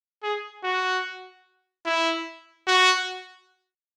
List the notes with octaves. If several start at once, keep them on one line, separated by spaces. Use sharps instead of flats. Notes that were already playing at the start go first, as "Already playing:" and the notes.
G#4
F#4
E4
F#4